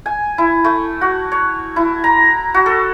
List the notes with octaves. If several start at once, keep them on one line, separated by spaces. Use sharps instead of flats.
G#5
E4
A3
F#4
C#5
E4
A#5
F#4
A4